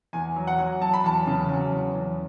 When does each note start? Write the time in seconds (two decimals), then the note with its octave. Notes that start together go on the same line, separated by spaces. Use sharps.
0.13 E2 G#5
0.36 F#3
0.47 F#5
0.58 F#3
0.81 F#3 A5
0.94 B5
1.04 E2 A5
1.27 C#3
1.49 F#3
1.72 E2
1.95 E2